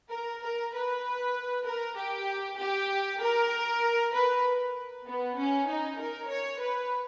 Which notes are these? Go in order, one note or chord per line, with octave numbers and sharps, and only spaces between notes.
A#4
A#4
B4
A#4
G4
G4
A#4
B4
B3
C#4
D#4
A#4
C#5
B4